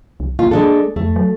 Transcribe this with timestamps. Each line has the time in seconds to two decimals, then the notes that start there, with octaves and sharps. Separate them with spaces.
0.20 C2
0.39 A#3 F4
0.51 G#3 D4 A4
0.96 F2 A3
1.16 F#3